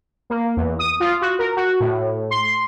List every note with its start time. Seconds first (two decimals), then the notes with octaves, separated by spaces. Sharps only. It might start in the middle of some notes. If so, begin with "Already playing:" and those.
0.30 A#3
0.57 E2
0.79 D#6
1.00 F4
1.21 F#4
1.39 A#4
1.57 F#4
1.80 A2
2.31 C6